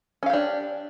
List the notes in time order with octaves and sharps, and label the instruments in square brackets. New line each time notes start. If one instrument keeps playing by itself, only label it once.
[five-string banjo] C#4
F5
G4
D4